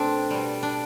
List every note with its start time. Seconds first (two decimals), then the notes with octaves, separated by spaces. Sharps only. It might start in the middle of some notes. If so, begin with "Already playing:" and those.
Already playing: B2 A3 C4 D4
0.30 B2 G3
0.63 D4